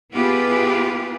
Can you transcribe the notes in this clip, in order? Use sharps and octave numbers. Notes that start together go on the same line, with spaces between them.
B3 E4 F4 G4 G#4 B4